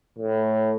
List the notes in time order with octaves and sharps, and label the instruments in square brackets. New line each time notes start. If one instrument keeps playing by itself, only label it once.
[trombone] A2